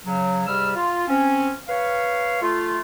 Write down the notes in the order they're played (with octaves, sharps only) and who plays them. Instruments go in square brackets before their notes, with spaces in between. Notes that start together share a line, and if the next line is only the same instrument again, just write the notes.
[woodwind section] C#3 F#3
G#2 C3 G3 E6 F6
F4
C4 C#4
B4 C#5 F5
A3 F4